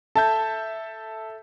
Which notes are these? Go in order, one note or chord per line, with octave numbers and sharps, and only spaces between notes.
A4 E5 A5 G6